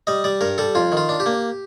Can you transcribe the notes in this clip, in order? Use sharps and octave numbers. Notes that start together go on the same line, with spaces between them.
G3 D#5
G3 D5
G2 A#4
G3 A4
F2 F4
D#3
F4
D4
G4
A#3